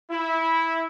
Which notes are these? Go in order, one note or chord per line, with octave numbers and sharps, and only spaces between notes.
E4